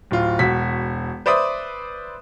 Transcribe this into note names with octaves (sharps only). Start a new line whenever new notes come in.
D1 F4
E1 F#4 B6
B4 C5 D5 E5 D#6